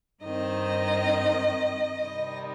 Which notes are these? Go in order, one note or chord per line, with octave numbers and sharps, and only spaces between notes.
G2 D#3 C4 D#5
C3 D#3 G3 D#5